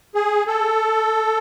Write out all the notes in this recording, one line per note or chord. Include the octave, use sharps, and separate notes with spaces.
G#4
A4